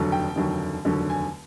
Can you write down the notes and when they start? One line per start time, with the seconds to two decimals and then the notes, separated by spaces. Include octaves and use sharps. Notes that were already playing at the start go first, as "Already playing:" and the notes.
Already playing: F1 D#2 D3 F#3
0.12 G5
0.36 F1 D#2 D3 F#3
0.85 F1 D#2 D3 F#3
1.10 G#5